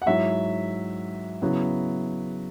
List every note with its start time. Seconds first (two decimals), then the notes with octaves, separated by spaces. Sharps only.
0.02 F#5
0.06 G#2 F#3 E4 E5
1.42 C#3 F#3 B3 E4